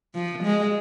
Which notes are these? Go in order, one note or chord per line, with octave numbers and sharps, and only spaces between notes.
F3
G#3